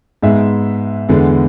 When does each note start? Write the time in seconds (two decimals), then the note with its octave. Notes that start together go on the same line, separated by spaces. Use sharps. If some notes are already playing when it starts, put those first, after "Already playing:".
0.23 G#2 G#3 B3 E5
1.09 E2 D3 G#3 B3